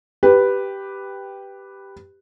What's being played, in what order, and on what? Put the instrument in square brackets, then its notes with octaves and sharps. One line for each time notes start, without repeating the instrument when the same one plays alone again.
[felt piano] G4 B4